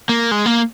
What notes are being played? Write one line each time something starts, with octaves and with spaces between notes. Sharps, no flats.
A#3
G#3
A#3